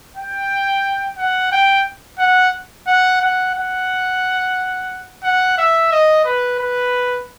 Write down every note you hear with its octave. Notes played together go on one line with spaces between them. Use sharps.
G5
F#5
G5
F#5
F#5
F#5
F#5
F#5
E5
D#5
B4
B4